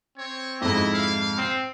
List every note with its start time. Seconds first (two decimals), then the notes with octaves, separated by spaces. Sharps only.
0.18 C4 C#5
0.61 F2 G#2 E4 D#5
0.94 F5
1.38 C4 C7